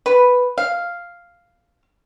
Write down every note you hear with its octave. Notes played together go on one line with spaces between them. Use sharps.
B4
F5